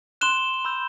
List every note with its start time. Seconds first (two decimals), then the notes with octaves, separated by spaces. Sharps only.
0.21 C6 F#6 E7 G7
0.65 B5 E6 G6